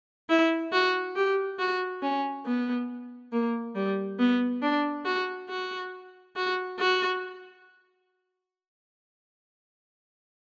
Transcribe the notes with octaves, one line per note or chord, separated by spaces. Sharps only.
E4
F#4
G4
F#4
C#4
B3
A#3
G3
B3
D4
F#4
F#4
F#4
F#4